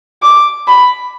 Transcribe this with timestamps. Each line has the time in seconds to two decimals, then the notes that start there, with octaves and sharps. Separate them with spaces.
0.22 D6
0.67 B5